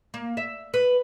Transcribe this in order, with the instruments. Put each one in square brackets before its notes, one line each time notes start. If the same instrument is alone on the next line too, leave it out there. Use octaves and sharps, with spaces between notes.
[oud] A#3
E5
B4